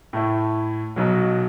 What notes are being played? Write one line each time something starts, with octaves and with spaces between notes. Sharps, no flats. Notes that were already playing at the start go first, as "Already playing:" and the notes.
A2 A3 E4
B1 B2 F#3